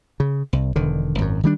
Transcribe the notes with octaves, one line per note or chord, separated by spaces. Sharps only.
C#3
C2
E1 D3 D#3
G#1 F#2
D#3 G3 D4